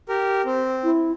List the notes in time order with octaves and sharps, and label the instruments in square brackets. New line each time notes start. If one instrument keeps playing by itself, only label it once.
[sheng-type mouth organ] G4 A#4
C4
[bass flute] E4